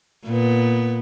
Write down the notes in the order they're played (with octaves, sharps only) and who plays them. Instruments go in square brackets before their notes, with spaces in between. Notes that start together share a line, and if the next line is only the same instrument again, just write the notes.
[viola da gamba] A#2 B3